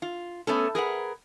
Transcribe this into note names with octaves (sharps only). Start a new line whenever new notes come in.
F4
A3 B3 C#4 A4
G#4 A#4 B4 F#5